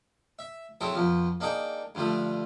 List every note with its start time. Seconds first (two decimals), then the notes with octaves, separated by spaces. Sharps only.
0.39 E5
0.81 F#3 C4 E4 G#4 A4
0.95 F2 B2 F3
1.40 A#3 D4 D#4 G#4 G5
1.95 G2 D3 F3 A3